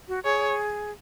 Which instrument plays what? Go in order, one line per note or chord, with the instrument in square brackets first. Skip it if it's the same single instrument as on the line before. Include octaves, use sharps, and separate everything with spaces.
[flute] F#4
[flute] G#4 [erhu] C#5